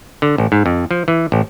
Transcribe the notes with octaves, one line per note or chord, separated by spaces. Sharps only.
D3
A1
G#2
F2
F3
E3
A1